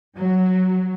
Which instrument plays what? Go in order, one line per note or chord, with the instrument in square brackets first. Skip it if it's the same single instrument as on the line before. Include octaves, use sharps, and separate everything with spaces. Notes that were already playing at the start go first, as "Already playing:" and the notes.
[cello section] F#3